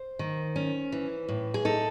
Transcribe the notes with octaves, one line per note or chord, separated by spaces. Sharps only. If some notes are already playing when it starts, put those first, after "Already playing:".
Already playing: C5
D#3
C#4
E3
A2
G#4
D#4 A4